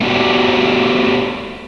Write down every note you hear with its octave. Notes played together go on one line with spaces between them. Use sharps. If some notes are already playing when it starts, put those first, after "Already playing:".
A3 B3 D4 F#4 G4